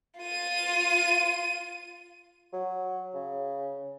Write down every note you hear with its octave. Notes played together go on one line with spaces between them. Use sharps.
F4 D#7
F#3
C#3